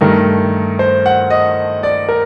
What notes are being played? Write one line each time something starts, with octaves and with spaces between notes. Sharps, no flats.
G2 D#3 A3 A#4
C5
F#5
D#5
D5
A#4